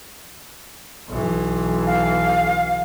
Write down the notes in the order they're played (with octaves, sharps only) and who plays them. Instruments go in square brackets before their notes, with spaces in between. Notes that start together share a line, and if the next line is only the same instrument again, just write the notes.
[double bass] B1 E3
[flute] F5